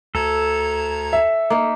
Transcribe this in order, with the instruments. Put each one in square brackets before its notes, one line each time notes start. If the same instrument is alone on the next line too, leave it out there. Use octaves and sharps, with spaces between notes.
[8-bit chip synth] D2 A#5 G#6 [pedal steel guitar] A4
[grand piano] E5
[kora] A#3 D#4